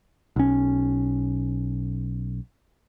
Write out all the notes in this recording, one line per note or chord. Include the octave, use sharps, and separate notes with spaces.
B1 C#4